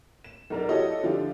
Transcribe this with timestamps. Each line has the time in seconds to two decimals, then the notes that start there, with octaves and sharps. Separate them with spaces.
0.24 E7
0.50 B1 A#4 D5
0.69 E4 F#4 G4 A4 C#5 D#5
1.03 D3 F3 E4 F4 G4 D5